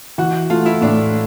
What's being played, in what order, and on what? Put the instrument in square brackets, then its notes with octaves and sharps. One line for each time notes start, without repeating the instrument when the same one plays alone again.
[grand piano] E3 [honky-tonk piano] F#4
[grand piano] A3 [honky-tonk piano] F4
[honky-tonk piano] E4
[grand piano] A2 [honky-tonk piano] D4